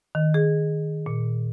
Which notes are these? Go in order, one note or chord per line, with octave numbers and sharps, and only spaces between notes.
D#3
G#4
A#2